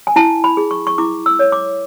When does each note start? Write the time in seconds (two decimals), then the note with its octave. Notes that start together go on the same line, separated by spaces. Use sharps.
0.07 G#5
0.16 E4 A5
0.44 B5
0.57 G#4
0.71 C#6
0.87 C#6
0.98 E4 D6
1.26 E6
1.39 C#5
1.52 D6